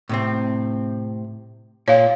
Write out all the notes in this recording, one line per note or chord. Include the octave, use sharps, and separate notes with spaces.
A2 C3 C4
A#2 C#5 F5